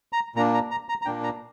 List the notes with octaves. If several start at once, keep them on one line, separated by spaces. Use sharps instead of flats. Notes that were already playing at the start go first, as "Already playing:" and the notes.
A#5
A#2 A#3 D4 A#5
A#5
A#5
A#5
A#5
A#2 A#3 D4 G5
A#5